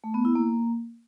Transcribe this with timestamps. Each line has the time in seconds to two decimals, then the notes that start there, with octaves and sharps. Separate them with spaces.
0.04 A3
0.14 B3
0.25 E4
0.35 A#3